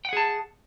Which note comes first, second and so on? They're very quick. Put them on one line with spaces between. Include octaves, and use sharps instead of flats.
G5 F#5 G#4 A5